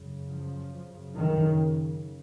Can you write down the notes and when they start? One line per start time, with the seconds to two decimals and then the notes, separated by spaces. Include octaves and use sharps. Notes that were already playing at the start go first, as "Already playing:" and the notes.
Already playing: F#2 C#3
0.28 F3
0.87 F#2 C#3
1.16 D#3